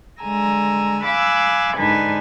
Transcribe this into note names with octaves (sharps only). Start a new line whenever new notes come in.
D3 G#3 G#5 A#5 E6
F5 G#5 B5 D6 E6 F#6
G#2 D3 D4 D#4 B4 G#5